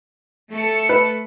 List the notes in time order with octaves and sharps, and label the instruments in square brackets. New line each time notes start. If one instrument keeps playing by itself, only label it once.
[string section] A3 A4 C#7
[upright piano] B4